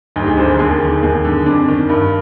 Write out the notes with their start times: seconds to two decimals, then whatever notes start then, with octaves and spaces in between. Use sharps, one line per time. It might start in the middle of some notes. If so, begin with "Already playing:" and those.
0.16 D2 D#4
0.22 G4
0.27 G#4
0.37 D3 C5
0.49 A#4
0.59 D#2 G#4
0.81 D#3
1.03 D#2 G#4
1.25 D3
1.46 F2 D4
1.68 D#3
1.89 G2